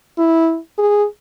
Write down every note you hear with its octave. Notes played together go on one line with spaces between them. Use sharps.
E4
G#4